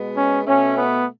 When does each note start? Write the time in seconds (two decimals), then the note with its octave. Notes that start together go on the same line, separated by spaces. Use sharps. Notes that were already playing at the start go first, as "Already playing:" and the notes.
Already playing: B2 G#3 B3
0.15 C#4
0.46 B2 A3 C#4
0.78 B3